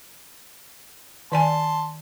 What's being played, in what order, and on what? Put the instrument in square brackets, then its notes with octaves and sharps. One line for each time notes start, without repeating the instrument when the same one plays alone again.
[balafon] D#3 D5 G#5 [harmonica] A5 C6